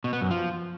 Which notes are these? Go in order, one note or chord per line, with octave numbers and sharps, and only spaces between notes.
B2
B3
F#2
F3